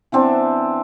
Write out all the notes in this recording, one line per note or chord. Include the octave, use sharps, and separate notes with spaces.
E3 B3 C4 D4